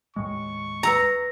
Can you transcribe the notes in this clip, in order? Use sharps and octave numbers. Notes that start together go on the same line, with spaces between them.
D#2 A2 G#3 C#6
B4 A#5 E6 C#7